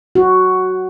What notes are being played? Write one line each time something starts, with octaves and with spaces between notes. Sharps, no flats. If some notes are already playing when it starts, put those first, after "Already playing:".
F#4